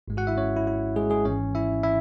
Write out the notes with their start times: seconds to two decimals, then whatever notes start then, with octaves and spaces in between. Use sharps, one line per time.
0.08 G#1 G#2 G#3
0.17 F#4 F#5
0.27 E4 E5
0.37 C#4 C#5
0.57 E4
0.67 E4
0.96 G#3 G#4
1.10 G#3 G#4
1.25 G#1 G#2 E3 C#4 C#5
1.55 E4 E5
1.83 E4 E5